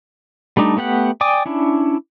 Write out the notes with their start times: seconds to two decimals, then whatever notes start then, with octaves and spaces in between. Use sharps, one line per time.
0.57 G3 A3 D4 D#4
0.77 A3 B3 G4 F#5
1.21 D5 G5 G#5 D6 D#6
1.46 C#4 D4 E4